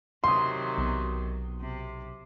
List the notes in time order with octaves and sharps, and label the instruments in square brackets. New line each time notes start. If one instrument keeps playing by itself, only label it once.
[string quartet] C3 D#3 F#3 [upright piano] C6 D#6
[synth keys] B1
[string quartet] C3